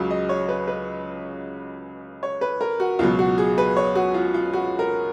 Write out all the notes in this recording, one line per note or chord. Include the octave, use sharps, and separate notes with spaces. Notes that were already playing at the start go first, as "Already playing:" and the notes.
Already playing: C#2 C#3 F#3
D#5
C#5
B4
B4
C#5
B4
A#4
F#4
C#2 B2 F#3 F4
F#4
G#4
B4
C#5
F#4
F4
F4
F#4
A#4